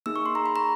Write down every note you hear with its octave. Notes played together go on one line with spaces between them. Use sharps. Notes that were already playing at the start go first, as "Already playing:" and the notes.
A#3 D#4 G#4 E6
C#6
C6
A#5
B5
A#5